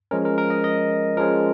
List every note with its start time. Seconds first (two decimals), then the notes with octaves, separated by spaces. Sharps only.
0.11 F3 G#3 C#4 A#4
0.25 A#4
0.38 A#4
0.50 D#5
0.64 D#5
1.17 F3 G#3 C#4 A#4